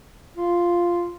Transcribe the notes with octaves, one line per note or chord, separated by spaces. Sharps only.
F4